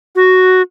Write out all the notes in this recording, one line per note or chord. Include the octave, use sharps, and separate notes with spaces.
F#4